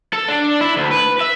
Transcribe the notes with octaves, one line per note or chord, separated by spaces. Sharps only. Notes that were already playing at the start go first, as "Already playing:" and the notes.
A4
D4
E4
D2
B4
E5